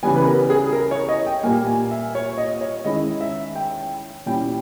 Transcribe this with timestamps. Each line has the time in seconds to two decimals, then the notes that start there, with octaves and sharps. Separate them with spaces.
0.03 C#3 E3 G3 B3 G#5
0.16 B4
0.25 A#4
0.50 G#4
0.73 A#4
0.91 C#5
1.09 D#5
1.26 G5
1.43 A#2 G3 A#3 G#5
1.67 G#5
1.91 E5
2.15 C#5
2.38 D#5
2.61 C#5
2.85 D#3 G#3 C#4 E4 D#5
3.21 E5
3.56 G5
4.26 A#2 G3 C#4 E4 G5